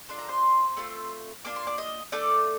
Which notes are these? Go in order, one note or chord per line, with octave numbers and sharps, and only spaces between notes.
D4 F4 A4 C6
A#5
C5 C6
A3 C4 F4
A#3 D4 F4 D6
C6
D5 D6
D#5 D#6
A3 D4 A4 D5 D6